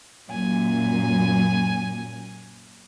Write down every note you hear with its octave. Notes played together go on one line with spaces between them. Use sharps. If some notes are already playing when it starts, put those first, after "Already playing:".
F#2 A#2 G#5